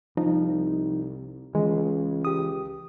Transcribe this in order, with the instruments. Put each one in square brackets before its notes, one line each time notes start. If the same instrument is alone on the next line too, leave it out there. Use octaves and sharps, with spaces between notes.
[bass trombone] C2 [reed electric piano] F3 [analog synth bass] D#4
[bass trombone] C#2 [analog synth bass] E3 [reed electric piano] G#3
[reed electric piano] G4 D#6